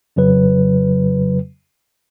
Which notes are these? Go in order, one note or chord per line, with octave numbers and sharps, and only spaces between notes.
F2 C#3 F#3 B4